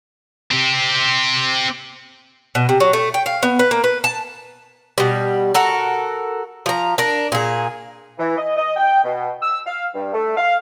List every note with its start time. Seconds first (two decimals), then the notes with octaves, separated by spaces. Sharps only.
0.51 C4 G4
2.55 B2
2.69 C3
2.80 F#3
2.93 A3
3.14 G5
3.26 F5
3.43 B3
3.59 B4
3.71 A#3
3.84 B4
4.04 A5
4.98 B2 G3
5.54 F#4 A4 A#4
6.66 F3 A#5
6.98 D4 A#4
7.32 A#2 G#4
8.19 E3
8.37 D#5
8.56 D#5
8.76 G5
9.04 B2
9.42 E6
9.66 F5
9.94 G2
10.13 A3
10.37 F5